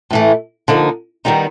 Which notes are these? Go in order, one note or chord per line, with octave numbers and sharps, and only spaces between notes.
A2 E3 A3
D3 F3 A#3 D#4
D#3 G3 B3 D#4